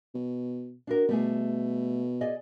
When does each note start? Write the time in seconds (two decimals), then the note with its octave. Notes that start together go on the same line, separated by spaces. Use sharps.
0.14 B2
0.87 D4 F#4 A#4
1.09 B2 G3 A3 G#4
2.21 G#4 D5 D#5